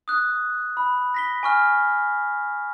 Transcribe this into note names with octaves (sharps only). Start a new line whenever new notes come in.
D#6 F#6
B5
A#6 B6 G7
G#5 C#6 F6